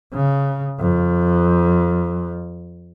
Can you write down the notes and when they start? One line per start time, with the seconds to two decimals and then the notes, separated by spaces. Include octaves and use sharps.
0.13 C#3
0.80 F2